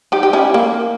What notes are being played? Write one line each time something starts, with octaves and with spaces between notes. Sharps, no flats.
D#4 G4
G4
C#4 E4
A#3